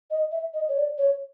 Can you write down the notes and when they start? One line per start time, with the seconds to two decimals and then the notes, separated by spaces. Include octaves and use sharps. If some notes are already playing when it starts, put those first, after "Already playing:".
0.11 D#5
0.32 E5
0.54 D#5
0.69 C#5
0.77 D5
0.98 C#5